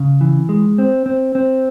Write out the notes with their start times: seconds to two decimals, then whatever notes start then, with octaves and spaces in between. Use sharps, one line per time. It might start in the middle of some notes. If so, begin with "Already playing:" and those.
Already playing: C#3
0.21 E3
0.49 G#3
0.78 C4
1.06 C4
1.35 C4